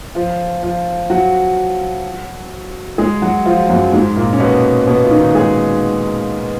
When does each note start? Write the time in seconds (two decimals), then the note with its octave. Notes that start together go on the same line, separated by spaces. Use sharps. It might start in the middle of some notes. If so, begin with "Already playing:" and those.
0.15 F3 F4
0.63 F3 F4
1.10 F#3 F#4
2.98 G#3 G#4
3.22 F#3 F#4
3.46 F3 F4
3.70 F#2 F#3
3.92 G#2 G#3
4.16 A#2 A#3
4.33 C#4
4.40 B2 B3
4.87 B2 B3
5.04 F4
5.11 D#3 D#4
5.35 G#3 G#4